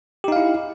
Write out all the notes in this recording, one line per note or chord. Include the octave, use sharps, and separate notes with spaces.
D#4 E4 G4 F5